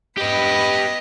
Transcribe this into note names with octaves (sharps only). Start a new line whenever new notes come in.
B3 G4 B4 D#5